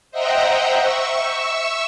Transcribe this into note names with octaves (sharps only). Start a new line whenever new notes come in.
C5 D#5 E5 F#5 G5 A#5
E5 C#6 E6